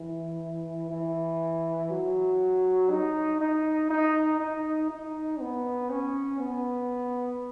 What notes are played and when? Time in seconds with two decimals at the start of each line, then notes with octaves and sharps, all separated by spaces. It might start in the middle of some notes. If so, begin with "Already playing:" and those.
Already playing: E3
0.90 E3
1.90 F#3
2.90 D#4
3.41 D#4
3.90 D#4
4.40 D#4
4.90 D#4
5.40 B3
5.90 C#4
6.40 B3